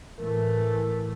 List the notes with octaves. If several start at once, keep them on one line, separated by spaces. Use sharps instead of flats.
A2 E3 A3 A#4